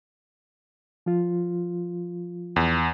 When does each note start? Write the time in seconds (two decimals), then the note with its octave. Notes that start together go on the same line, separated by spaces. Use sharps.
1.06 F3 F4
2.56 E2